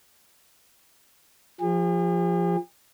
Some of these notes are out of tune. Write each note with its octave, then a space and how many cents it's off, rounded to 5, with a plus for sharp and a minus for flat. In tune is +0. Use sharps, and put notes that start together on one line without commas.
F3 +0 G#4 -45